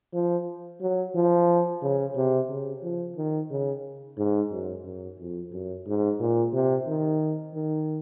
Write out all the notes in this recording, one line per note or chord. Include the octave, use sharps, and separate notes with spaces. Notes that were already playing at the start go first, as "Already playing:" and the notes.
F3
F#3
F3
C#3
C3
C#3
F3
D#3
C#3
G#2
F#2
F#2
F2
F#2
G#2
A#2
C3
D#3
D#3